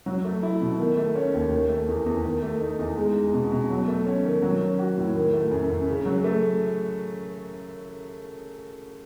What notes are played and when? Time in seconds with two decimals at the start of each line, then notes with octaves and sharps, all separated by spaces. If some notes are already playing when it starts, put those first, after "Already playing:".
0.06 F#3
0.25 A3
0.43 E4
0.61 B2
0.79 D#3
0.97 A3
1.15 C#4
1.34 D#2
1.51 D#3
1.69 A3
1.88 E2
2.06 E2
2.24 D#3
2.43 A3
2.61 D#4
2.79 E2
2.97 G#3
3.15 D#4
3.33 B2
3.52 B2
3.70 F#3
3.88 A3
4.06 C#4
4.25 D#3
4.42 F#3
4.61 C#4
4.79 F#4
4.98 A2
5.15 D#3
5.33 A3
5.51 F#2
5.70 F#2
5.88 C#3
6.06 F#3
6.24 A3